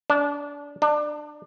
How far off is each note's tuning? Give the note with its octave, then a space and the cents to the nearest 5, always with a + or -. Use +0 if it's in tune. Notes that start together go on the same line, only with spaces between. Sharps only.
D4 -25
D4 +25